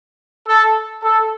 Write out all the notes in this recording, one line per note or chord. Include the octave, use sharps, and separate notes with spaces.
A4
A4